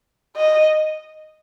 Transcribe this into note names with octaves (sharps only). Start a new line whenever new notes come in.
D#5